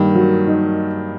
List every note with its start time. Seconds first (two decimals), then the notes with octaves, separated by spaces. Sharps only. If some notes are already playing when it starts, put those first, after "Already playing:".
Already playing: G2 D#3 A#3
0.15 F#3
0.47 D#4